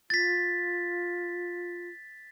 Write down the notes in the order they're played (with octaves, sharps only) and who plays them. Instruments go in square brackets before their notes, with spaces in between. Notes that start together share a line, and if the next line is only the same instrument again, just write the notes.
[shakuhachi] F4 [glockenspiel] A6 B6